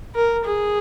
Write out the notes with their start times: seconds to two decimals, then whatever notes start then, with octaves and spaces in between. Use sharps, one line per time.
0.15 A#4
0.45 G#4